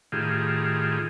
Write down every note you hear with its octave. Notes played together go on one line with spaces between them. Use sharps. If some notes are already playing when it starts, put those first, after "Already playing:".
A2 D#3 F4 G4 G#4